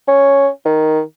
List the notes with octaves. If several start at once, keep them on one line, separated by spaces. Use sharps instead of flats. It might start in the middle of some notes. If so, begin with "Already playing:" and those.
C#4
D#3